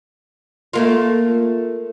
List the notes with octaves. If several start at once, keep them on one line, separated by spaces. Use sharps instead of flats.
A3 A#3 F4